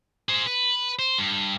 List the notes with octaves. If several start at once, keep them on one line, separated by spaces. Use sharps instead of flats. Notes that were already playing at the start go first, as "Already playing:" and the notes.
G#4 C5
B4
C5
G2